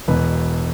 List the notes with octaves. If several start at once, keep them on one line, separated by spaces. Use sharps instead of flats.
E1 E2 B2 B4